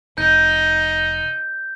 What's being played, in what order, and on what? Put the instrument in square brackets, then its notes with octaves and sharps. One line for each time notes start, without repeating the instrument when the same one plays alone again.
[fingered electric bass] F1 [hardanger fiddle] D#4 [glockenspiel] G6